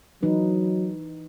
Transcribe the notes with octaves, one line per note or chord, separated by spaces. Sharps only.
E3 F#3 D#4 B4